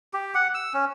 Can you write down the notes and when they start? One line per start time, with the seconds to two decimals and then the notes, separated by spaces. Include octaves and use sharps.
0.14 G4
0.35 F#5
0.54 E6
0.74 C#4